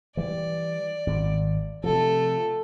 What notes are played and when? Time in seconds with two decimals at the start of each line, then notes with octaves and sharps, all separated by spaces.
0.17 E3 G3 D5
1.07 G#1
1.84 C3 F3 A3 A4